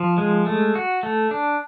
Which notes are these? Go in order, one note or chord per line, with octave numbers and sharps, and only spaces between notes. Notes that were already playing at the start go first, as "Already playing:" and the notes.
Already playing: F3
G#3
A3
F#4
A3
D4